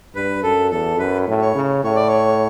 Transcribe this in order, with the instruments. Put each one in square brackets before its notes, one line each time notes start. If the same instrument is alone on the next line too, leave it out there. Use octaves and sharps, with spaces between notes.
[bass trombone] G2 [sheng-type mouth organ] B4
[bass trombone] F#2 [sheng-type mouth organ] A4
[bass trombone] E2 [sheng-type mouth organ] A4
[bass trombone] F#2 [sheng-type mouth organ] B4
[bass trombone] A2
[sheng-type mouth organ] C#5
[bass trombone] C#3
[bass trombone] A2 [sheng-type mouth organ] C#5
[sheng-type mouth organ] D5
C#5